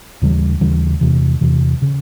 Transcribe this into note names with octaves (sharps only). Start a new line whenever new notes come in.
D#2 C#3 E3 G3
D#2 C#3 E3 G3
E2 C3 E3
E2 C3 E3
C#3